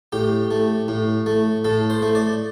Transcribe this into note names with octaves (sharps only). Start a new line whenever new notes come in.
A2 G4
A3
A2
A3
A2 A4
C5
A3
D5